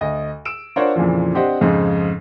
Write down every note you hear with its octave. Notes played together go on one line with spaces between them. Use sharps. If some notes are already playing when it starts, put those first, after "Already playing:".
D2 D#5
E6 D7 E7
D4 F4 A#4 C5 C#5 F#5
F2 A#2 C#3 E3 F3
C4 D4 G4 C5 D#5 F#5
F2 G#2 C#3 F3 D#4